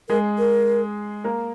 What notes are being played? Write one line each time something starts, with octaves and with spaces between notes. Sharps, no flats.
G#3 G#4 A#4
A#4
A#3 A#4